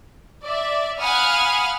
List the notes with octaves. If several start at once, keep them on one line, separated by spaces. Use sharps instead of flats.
D5 E5
F5 F#5 G#5 B5 D#6 F6